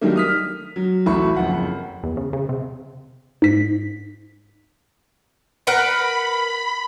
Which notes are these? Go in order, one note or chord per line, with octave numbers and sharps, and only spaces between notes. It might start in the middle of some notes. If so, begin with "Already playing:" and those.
D#3 F#3 G3 A3 A#3
D#6 F6 B6
F#3
A1 E4 F#4 A4 B5 C#6
F#1 F2 F#5 B5
E2
C#3
C#3
C3
G#2 B6
A#4 B4 F#5 B5